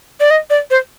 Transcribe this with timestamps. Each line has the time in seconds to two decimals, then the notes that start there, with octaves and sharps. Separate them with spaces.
0.20 D5
0.31 D#5
0.50 D5
0.71 C5